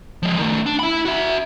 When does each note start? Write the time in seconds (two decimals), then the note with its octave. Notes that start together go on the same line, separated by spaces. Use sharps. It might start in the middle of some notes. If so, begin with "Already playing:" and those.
0.23 F3 G#3
0.39 D#3 A3
0.66 D4
0.79 E4 B5
1.05 F#4 E5